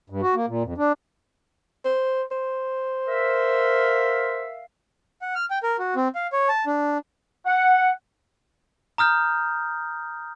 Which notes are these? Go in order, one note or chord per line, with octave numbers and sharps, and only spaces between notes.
G2
F#4
A#3
A#2
F2
D4
C5
C5
A#4 E5 F5
F#5
F6
G5
A#4
F#4
C4
F5
C#5
A5
D4
F#5
A#5 D#6 F6 G6